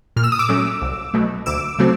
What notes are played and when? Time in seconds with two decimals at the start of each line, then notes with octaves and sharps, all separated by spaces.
0.16 A#2 F6
0.24 E6
0.32 D#6
0.39 D6 E6
0.49 F#3 A3 C#4
0.81 C2
1.14 B2 F#3 A3
1.46 D2 D6 E6
1.79 C#3 F#3 A3 C4